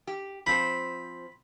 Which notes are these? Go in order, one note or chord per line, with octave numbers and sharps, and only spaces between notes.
G4
F3 C4 C5 B5